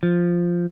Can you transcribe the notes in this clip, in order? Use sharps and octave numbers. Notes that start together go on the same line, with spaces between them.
F3